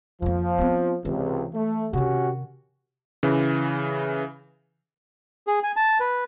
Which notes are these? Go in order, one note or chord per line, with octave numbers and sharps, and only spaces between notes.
F2 F3 A#3
B3 C4
C#2 C3 E3
A3
C3 D#3 C#4 F#4 G4
C#3 E3
G#4
G#5
A5
B4